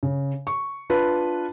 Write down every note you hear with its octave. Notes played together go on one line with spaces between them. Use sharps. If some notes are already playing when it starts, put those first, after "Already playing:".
C#3
C#6
D4 F4 B4